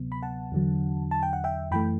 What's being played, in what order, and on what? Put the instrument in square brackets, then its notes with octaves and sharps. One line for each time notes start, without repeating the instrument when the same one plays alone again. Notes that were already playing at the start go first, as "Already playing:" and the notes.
Already playing: [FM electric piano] D2 C3 F#3 B3
B5
F#5 A5
E2 D3 F#3
A5
G5
F#5
E5 G5
F#2 E3 A3 G5 B5